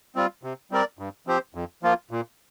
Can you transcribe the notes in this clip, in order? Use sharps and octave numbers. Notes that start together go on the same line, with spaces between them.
G3 C4 F4
C3
G3 C4 A#4 D5
G2
F3 C4 G4 C5
F2
F3 A#3 F4
A#2